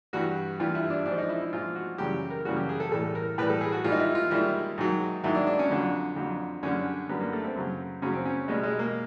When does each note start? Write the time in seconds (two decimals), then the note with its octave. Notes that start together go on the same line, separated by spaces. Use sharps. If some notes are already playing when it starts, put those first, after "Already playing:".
0.13 G2 E3 G3 F#4
0.60 G2 E3 G3 F4
0.75 E4
0.90 D4
1.06 G#2 F3 D4
1.18 D#4
1.29 E4
1.41 E4
1.53 G#2 F3 F4
1.75 F#4
1.98 F#2 C#3 E3 G3 G4
2.14 G4
2.30 A#4
2.45 F#2 C#3 E3 G3 F#4
2.57 G4
2.69 G#4
2.80 A4
2.92 A2 E3 G3 A4
3.15 A#4
3.38 A2 E3 G3 B4
3.49 A4
3.61 G#4
3.72 F#4
3.84 G#2 D#3 G3 F4
3.92 D#4
3.99 E4
4.15 F4
4.30 G#2 D#3 G3 E4
4.78 G#2 D#3 F#3
5.24 G#2 D#3 F#3 E4
5.35 D4
5.47 D4
5.59 C#4
5.70 F2 D3 F#3
6.16 F2 D3 F#3
6.63 F#2 D3 G3 C#4
7.09 F#2 D3 G3 B3
7.21 A#3
7.33 A3
7.44 C4
7.56 F#2 C#3 F#3
8.02 F#2 C#3 F#3 C#4
8.13 C4
8.25 C#4
8.48 B2 G3 G#3
8.63 G#3
8.79 A#3